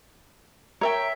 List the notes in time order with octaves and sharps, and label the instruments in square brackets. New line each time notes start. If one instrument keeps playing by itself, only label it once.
[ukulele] A#4 [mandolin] C#5 E5 G5